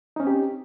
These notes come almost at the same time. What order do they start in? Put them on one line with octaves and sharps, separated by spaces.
D#4 C#4 C4 G4